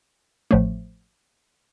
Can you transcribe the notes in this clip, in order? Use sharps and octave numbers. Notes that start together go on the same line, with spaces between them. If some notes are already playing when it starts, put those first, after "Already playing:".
A1 A2 F3 A3